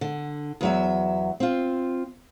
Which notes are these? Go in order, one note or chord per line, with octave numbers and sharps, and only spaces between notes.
D3
E2 F#3 E5
C4 F4